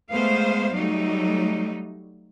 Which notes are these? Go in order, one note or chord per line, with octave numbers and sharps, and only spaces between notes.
G#3 A3 B3 C5 F5
F#3 G3 A3 D#4